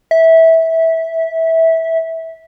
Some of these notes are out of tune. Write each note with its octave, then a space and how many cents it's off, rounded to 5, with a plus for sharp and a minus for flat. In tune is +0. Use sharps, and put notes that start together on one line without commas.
E5 -15